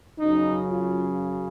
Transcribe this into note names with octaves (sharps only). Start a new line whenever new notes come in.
F#2 C#3 F#3 D#4
F4